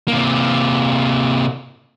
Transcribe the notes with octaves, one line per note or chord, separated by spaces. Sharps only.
C3 A#3